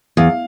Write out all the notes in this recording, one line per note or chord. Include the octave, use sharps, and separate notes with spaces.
E2 F5